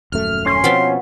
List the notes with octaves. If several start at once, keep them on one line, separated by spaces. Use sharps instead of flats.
D#1 F#2 A3 F6
C#4 C6
B2 F3 B3 C4 F4